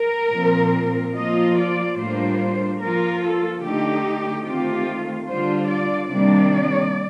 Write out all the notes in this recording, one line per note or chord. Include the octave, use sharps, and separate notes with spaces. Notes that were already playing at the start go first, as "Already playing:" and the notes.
Already playing: A#4
A#2 F3 C4
F3 A#3 F4 D#5
D5
A2 G3 A#3 D4 F4 C5
F3 A#3 F4 A#4
A4
D3 A3 D#4 G4
D#3 A3 C4 F4 G4
D3 G3 D4 F4 C5
D5
C3 D#3 G3 A#3 D4 D5